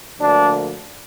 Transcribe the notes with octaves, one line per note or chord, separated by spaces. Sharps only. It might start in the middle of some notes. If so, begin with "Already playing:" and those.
D2 D3 F3 A#3 D4